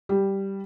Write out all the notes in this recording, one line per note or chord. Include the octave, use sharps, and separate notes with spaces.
G3